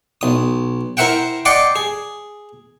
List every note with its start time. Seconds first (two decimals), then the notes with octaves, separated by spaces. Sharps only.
0.21 B1 D#6
0.97 E4 A#4 C5 E5 F#5 G5
1.45 D5 D#5 F#5 G5 C6 D6
1.76 G#4